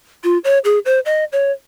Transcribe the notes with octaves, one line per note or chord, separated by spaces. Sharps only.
F4
C#5
G#4
C5
D#5
C#5